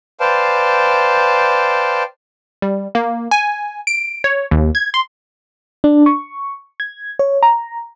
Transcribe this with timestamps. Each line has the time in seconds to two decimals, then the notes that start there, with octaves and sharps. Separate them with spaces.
0.20 B4 C5 D5 F5 G5 A5
2.62 G3
2.95 A#3
3.31 G#5
3.87 D7
4.24 C#5
4.51 D#2
4.75 G#6
4.94 C6
5.84 D4
6.06 C#6
6.80 G#6
7.19 C#5
7.43 A#5